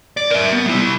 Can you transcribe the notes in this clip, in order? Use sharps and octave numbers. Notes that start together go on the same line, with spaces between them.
D5
A#4 E5
B3
G3 E4